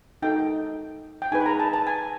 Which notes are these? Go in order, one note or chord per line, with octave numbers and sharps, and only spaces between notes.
D#4 F#4 A4 G5
G5
D#4 G#4 B4 G#5
B5
A#5
A5
A5
G#5